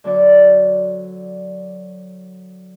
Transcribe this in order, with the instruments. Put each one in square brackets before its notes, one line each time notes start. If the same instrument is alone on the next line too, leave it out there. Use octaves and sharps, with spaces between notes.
[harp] D3 F#3 D4 D5 F#5